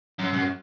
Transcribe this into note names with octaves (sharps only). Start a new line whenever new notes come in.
F#2
F#2